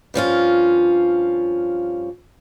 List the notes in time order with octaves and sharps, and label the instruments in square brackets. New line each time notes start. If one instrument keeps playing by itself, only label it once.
[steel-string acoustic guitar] G2 F3 C#4 F4